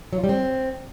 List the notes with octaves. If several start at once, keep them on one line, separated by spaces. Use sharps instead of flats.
F#3
F4
G3
C4